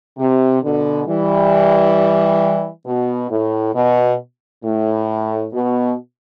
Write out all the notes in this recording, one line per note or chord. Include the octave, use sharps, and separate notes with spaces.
C3
B2 D3
E3 G3
B2
A2
B2
A2
B2